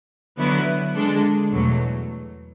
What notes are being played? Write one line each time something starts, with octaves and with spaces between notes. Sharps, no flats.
D3 F#3 B3 E4
D3 G#3 D4 A4
E2 B2 F#3 A3